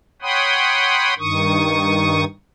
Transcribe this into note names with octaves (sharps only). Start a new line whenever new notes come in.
C#5 F#5 G5 B5 C6 D#6
G2 D#3 C#6 D#6